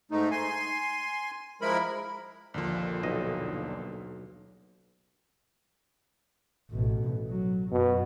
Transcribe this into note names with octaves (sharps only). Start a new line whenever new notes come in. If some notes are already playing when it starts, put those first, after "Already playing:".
G#2 A3 D#4
G#5 C6
F3 G#3 E4 A#4 B5
A#1 D#2 A#2 D3 F3
B1 D#5
A1 B2
F#3
F#2 B2